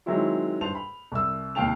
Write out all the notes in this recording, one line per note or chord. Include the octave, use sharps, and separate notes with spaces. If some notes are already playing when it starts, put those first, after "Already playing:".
D#3 F#3 G#3 C4 E4 F4
G2 C5 A5 F7
B5
C2 E6
D#2 C3 F5 G5 A5 F7